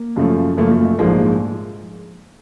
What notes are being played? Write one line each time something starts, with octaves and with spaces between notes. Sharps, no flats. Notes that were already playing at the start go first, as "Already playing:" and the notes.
Already playing: A#3
F#2 C#3 F3 A3
F#2 C#3 F3 A3 A#3
A3
A3
A#1 G#2 F3 G#3 A#3